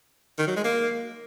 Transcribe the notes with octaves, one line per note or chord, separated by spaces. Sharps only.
D#3
F#3
G#3
A#3